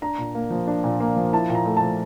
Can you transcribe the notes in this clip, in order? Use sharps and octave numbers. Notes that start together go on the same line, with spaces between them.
D4 A#5
A#2
A#3
F3
D4
A#2
A#3
F3
E4 A5
A#2
A#5
A3
F3 A5